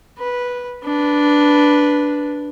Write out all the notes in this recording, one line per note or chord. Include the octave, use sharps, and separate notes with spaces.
B4
D4 B4